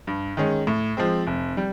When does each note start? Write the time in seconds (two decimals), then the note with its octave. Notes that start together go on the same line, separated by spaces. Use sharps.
0.07 G2
0.37 D#3 G#3 C#4
0.67 A2
0.97 F3 G#3 C4
1.27 F1
1.57 G3